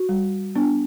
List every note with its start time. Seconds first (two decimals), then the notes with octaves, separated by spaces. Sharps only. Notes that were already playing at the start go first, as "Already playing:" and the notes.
Already playing: F#4
0.09 G3
0.56 B3 D4